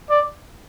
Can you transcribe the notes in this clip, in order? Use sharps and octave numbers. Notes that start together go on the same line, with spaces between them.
D5